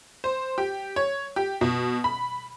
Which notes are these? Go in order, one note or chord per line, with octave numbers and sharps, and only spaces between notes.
C5
G4
C#5
G4
B2
B5